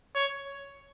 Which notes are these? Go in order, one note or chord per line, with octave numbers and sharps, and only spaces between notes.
C#5